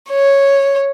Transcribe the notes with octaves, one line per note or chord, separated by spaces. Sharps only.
C#5